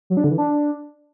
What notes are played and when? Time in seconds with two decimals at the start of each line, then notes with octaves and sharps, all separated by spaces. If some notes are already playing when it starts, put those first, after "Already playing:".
0.10 F#3
0.17 D4
0.24 D3
0.31 E3
0.38 D4